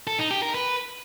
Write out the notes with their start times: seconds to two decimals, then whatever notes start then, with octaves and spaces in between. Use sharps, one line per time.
0.07 A4
0.19 D#4
0.31 G4
0.43 A#4
0.54 B4